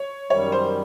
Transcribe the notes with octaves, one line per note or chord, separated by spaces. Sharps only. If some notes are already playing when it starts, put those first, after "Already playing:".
Already playing: C#5
F#2 D#3 G3 C#5
C5